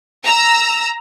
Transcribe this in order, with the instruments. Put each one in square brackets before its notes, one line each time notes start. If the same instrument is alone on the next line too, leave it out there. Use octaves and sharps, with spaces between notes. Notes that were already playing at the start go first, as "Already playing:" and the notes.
[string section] A#5 E6